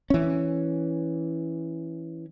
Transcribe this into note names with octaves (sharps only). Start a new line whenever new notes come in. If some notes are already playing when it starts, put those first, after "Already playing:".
E3 C#4